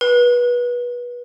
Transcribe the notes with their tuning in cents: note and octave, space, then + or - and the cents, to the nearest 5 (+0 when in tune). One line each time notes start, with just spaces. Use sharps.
B4 -25